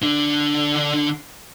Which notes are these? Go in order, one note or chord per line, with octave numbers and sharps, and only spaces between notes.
D3 D4